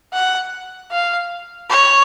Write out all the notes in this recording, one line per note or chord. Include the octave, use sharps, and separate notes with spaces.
F#5
F5
C#5